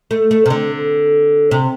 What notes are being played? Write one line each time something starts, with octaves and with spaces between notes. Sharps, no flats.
A3
A3
C3
D3
C3